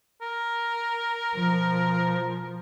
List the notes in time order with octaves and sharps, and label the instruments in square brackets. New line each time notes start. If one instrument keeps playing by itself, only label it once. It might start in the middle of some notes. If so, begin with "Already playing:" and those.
[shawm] A#4
[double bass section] B2 F3